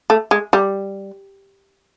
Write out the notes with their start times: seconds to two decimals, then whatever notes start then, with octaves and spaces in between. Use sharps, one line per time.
0.10 A3
0.31 G#3
0.53 G3